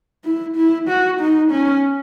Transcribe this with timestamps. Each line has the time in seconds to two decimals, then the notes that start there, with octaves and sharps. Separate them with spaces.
0.24 E4
0.56 E4
0.88 F#4
1.20 D#4
1.51 C#4